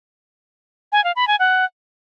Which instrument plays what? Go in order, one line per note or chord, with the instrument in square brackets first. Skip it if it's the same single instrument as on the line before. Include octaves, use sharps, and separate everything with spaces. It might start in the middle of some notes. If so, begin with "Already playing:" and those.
[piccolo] G#5
F5
B5
G#5
F#5